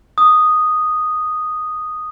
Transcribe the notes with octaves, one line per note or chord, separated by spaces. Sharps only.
D6 D#6